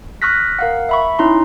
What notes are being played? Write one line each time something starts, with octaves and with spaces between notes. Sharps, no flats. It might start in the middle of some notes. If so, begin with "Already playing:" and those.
C#6 D#6 F6 F#6 A#6 B6
A#4 F5 F#5
E5 B5 C#6
C#4 D#4 E4 A#5 C6